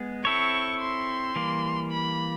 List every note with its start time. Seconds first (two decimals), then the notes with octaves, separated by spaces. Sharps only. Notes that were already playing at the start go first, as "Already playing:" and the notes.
Already playing: G#3 B3 G#4
0.25 C4 E4 A4 C#5 C#6
0.81 C6
1.36 E3 G3 A#3
1.92 B5